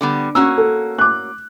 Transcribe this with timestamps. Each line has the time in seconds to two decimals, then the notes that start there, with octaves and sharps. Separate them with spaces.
0.01 D3 G3 B3
0.35 A#3 C#4 F#4 E6
0.58 A4
0.99 D6 F#6